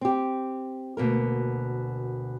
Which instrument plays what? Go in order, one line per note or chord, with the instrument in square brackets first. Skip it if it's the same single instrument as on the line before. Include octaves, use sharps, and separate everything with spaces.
[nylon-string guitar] C4 G4
D2 B2 A#3 A#4